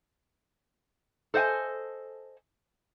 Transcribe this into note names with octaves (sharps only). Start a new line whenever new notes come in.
A4 C5 D#5 F#5 G#5